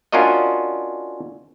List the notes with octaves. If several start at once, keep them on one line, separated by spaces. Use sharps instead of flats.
C#4 D4 F4 F#4 A#4 D#5